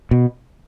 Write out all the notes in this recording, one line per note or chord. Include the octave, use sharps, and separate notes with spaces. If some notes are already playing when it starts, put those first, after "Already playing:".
B2